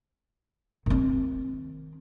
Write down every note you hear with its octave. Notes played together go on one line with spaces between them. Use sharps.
D#3 C4